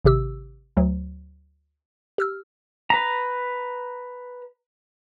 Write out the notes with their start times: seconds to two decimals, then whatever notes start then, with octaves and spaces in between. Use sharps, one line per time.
0.05 G#1 C3 G4 E6
0.77 D2 F#3
2.18 G4 E6 F6
2.90 B4 A#5